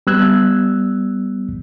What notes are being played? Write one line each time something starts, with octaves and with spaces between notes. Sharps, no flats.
G3 B3 E6 F#6 G#6